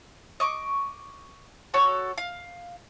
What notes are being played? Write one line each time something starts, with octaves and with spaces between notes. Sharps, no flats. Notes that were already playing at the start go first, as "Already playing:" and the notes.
D#5 C#6 D6
F#4 A4 C#5
F5